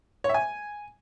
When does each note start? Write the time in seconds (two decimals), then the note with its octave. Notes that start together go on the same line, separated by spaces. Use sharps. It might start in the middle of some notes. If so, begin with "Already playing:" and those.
0.24 C#5
0.29 E5
0.34 G#5